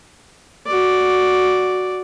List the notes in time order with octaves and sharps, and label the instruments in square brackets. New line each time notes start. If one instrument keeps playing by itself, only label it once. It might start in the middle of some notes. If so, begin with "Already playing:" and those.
[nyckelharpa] F#4 D5